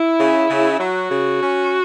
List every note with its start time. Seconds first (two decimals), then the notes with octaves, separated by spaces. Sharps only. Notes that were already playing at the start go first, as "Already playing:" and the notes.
Already playing: E4
0.18 C#3
0.49 C#3
0.79 F#3 F#4
1.10 C#3
1.41 C#4